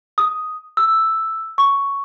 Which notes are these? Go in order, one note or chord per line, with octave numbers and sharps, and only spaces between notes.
D#6
E6
C#6